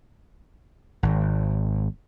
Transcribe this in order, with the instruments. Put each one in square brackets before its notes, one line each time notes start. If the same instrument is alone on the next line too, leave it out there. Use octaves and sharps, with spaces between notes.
[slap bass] G#1